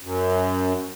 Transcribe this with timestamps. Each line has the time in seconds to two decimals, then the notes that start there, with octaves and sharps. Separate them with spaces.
0.02 F#2